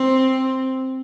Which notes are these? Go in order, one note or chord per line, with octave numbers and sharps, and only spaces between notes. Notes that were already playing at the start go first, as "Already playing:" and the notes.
Already playing: C4